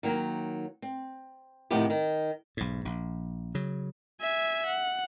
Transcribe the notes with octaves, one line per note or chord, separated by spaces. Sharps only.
D#3 F#3 A#3
C4
A2 C3 D#3 F3 B3 G4
D#3
B1 G#2
A#1
C#3 F#3
E5 G#5
F#5